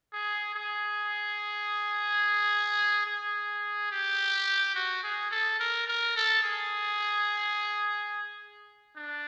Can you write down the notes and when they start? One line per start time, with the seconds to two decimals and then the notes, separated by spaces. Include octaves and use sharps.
0.12 G#4
0.54 G#4
3.06 G#4
3.91 G4
4.75 F#4
5.04 G#4
5.31 A4
5.60 A#4
5.87 A#4
6.16 A4
6.43 G#4
8.97 D4